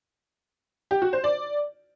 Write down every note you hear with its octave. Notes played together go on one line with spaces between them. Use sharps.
G4
F#4
C5
D5